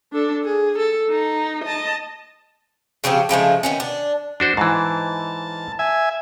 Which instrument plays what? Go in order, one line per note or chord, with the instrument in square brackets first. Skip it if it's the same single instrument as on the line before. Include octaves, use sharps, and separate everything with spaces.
[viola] D4 A4
G#4
A4
D#4
D#5 A5
[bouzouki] C#3 F3 C4 G4
C#3 F3 G#3 A3
D#3 B3 C#4
D4
[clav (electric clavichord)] D4 F#4 C5
[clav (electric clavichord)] G#2 E3 [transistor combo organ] A5
[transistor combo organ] E5 G#5